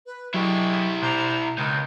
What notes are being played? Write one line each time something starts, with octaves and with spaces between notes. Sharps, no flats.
B4
D3 E3 F#3 G#3 E4 G4 C#6
B2 F3 D4 C5 A#5
C#2 C3 D#3 G6